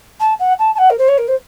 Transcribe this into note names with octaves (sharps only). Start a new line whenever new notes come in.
A5
F#5
A5
A5
F#5
A#4
C5
C#5
A#4
C5